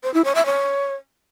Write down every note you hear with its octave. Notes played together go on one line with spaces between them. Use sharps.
C5
E4
C#5
E5
C#5